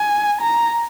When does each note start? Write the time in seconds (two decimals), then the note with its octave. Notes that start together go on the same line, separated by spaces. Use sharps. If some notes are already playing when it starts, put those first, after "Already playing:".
Already playing: G#5
0.41 A#5